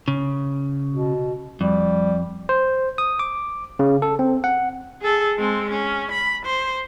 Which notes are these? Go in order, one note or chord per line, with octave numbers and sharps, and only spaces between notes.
C#3
B2
F2 G3
C5
D#6
D6
C#3
A4
C4
F#5
G#4 A4
G#3 C4
C#4
B5
C5